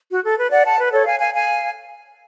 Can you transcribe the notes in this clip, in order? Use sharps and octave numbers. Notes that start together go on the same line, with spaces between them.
F#4
A4
B4
D5 F#5
F#5 A5
B4
A4 C#5
F5 G#5
F5 G#5
F5 G#5